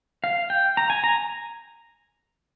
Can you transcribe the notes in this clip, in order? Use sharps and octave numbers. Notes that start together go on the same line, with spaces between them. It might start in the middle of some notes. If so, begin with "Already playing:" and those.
F5
G5
A#5
G#5
A#5